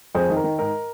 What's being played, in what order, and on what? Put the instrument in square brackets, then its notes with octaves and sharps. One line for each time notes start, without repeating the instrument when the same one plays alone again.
[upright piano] F2 G#4 C5
D#3
A#4
D#3
G#2 A#4